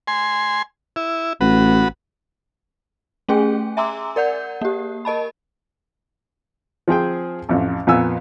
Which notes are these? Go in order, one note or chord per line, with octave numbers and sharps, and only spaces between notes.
G#5 C6
E4
A1 F#4 B4
A3 C#4 G#4 G5 G#5
E5 G#5 A#5 C6 D6 E6
A#4 D5 F#5 G6
A#3 G4
A#4 D#5 A5 B5
F3 C4 G#4 G5
A1 F2
F2 A#2 B3 G#5 E6